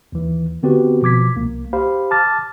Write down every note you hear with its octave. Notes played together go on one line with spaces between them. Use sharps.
D#2 E3
D3 B3 C4 F#4 G4 B4
B2 F3 D6 G#6 B6
C2 A#3
G4 C5 F5 B5
A5 D6 F6 A6